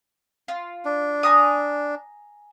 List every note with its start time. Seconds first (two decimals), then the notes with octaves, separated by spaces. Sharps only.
0.48 F4
0.85 D4
1.23 G#5 A#5 D#6